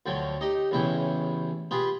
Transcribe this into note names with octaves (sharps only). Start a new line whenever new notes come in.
D2 F3 F#3 G5
D#4 G4 D#5
A1 E2 C#3 E4 G5
F4 G4 G#4 B4